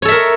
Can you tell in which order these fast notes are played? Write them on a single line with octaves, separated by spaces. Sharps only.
C#5 A4 E5 A#4